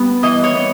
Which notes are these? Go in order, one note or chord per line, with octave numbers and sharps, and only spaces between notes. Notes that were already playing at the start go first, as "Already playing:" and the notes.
Already playing: G3 B3
E3 D#5
C#5
B3